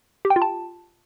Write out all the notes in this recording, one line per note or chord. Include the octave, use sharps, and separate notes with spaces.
G4
G5
F4
A5